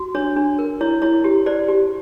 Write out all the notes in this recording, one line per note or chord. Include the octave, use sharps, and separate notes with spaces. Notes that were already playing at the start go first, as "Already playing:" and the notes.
Already playing: F#4
D4 C#5
D4
A#4
E4 C#5
E4 C#5
G4
C5 D5
G4